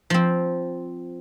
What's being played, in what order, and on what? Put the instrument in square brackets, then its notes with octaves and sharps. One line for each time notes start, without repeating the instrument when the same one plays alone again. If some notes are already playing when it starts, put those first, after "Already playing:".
[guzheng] F3 C4